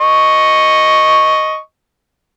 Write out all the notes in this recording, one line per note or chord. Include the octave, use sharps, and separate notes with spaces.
D#5 C#6